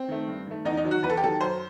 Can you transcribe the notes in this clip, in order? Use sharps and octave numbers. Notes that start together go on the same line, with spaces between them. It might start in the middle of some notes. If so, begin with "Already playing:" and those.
Already playing: C4
D#3 A3
G2
D#3 A3
E2 D#4
D#4
D#3 F#3
F#4
E2 B4
A4
G4
D#3 F#3 A4
F#2 C5